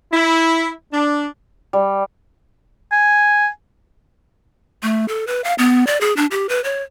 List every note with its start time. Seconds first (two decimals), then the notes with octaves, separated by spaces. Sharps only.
0.12 E4
0.92 D4
1.73 G3
2.92 G#5
4.83 A3
5.08 A4
5.27 B4
5.44 F5
5.58 B3
5.87 D5
6.01 G#4
6.17 D4
6.31 G4
6.49 B4
6.64 C#5